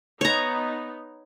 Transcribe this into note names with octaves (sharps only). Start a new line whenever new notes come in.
B3 D#4 C#5 A#5